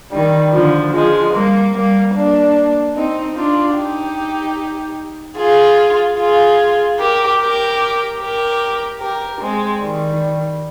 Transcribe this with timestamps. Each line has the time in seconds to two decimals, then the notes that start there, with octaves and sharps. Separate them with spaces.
0.12 D#3 G3
0.53 D3 F3
0.93 F3 G#3
1.34 G3 A#3
1.74 G3 A#3
2.14 A#3 D4
2.95 C4 D#4
3.35 D4 F4
3.76 D#4 G4
5.37 F4 G#4
6.18 F4 G#4
6.99 G4 A#4
7.39 G4 A#4
8.20 G4 A#4
9.00 G4 A#4
9.40 G#3 C4
9.81 D#3 G3